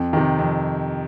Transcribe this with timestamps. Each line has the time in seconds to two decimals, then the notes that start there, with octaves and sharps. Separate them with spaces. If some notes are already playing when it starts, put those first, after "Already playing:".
Already playing: F2
0.13 C3 D#3
0.39 F2